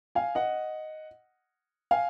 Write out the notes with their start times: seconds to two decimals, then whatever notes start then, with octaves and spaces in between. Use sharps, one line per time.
0.15 F5 G#5
0.35 D#5 F#5
1.91 F5 G#5